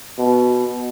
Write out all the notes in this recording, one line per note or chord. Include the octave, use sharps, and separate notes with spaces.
B2